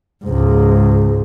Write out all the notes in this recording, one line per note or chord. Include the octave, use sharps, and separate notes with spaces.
C#2 G#2